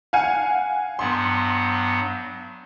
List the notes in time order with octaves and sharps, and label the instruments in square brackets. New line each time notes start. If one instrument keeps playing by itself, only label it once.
[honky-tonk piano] F5 F#5 G#5
[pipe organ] G2 F#3 B3 [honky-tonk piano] C6